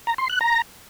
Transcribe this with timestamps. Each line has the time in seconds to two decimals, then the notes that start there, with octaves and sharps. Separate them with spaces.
0.07 A#5
0.18 C6
0.29 F#6
0.41 A#5